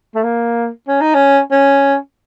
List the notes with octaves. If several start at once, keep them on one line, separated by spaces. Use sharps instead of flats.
A3
A#3
C#4
D#4
C#4
C#4